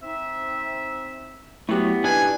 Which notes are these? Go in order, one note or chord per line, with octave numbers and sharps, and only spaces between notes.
C4 D#4 E5
F#3 A3 B3 E4 G4
D4 D#4 B4 G#5